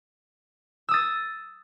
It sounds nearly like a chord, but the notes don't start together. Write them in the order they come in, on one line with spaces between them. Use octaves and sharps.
E6 D#6 A6